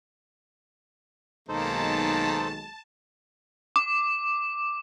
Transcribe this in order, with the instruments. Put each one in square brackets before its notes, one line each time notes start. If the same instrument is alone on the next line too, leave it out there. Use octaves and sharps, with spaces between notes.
[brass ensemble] B1 G#3 [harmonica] D#3 A#3 [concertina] D#4 A4 C5 [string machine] A5
[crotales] D6